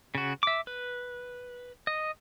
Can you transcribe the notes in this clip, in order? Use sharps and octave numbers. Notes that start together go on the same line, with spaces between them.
C#3 F#4
E5 D6
B4
D#5